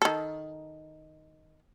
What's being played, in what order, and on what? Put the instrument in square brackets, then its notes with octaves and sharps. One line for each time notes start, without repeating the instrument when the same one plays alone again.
[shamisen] D#3 A4